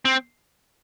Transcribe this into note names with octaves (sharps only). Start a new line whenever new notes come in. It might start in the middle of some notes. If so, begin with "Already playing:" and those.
C4